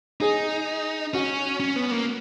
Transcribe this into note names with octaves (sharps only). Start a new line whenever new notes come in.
D#4 G#4
C#4 F#4
C#4
B3
A#3